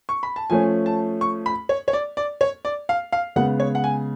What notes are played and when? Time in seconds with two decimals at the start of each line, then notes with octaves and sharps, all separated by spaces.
0.09 C#6
0.23 B5
0.36 A5
0.50 F3 A3 C#4 G#5
0.86 A5
1.21 C#6
1.46 B5
1.69 C#5
1.88 C#5
1.93 D5
2.17 D5
2.41 C#5
2.65 D5
2.89 F5
3.12 F5
3.36 C#3 G#3 B3 F#5
3.60 C#5
3.75 F#5
3.84 G#5